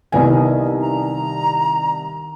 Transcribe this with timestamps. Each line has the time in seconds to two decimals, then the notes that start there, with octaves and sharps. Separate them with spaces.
0.12 C2 D#3 B3 G#5
0.81 A#5